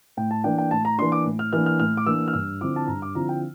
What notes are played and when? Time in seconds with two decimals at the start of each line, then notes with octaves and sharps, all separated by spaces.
0.17 A2 G5
0.31 A5
0.44 E3 A#3 D4 G5
0.58 G5
0.71 A2 A5
0.85 A#5
0.98 E3 A#3 D4 C6
1.12 D6
1.25 A2
1.39 F6
1.53 E3 A#3 D4 F6
1.66 F6
1.79 A2 F6
1.97 D6
2.06 E3 A#3 D4 E6
2.28 F6
2.33 G2 E6
2.61 D3 F3 C4 E4 D6
2.76 A5
2.88 G2 A#5
3.02 D6
3.15 D3 F3 C4 E4 A#5
3.29 G5